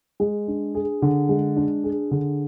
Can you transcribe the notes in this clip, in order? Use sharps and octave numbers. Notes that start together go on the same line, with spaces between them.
G#3
D4
G#4
D3
G#3
D4
G#4
D3